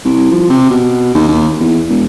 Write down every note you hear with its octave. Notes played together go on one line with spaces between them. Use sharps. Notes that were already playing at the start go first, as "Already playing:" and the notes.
C2
F3
C3
B2
D#2
D#2
E2
E1